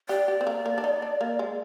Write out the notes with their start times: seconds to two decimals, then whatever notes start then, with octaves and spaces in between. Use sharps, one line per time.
0.09 G4 D5
0.28 G4
0.41 C4
0.47 A#3
0.66 A#3
0.78 D4
0.84 D#4
1.02 D4
1.21 A#3
1.39 G#3